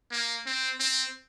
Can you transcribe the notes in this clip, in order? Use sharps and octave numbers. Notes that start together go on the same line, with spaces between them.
A#3
C4
C4